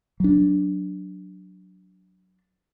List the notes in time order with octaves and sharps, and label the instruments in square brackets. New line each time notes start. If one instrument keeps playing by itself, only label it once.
[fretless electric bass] F#3 D4